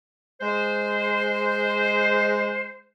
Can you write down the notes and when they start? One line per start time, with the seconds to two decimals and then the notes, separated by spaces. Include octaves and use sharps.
0.41 G#3 C5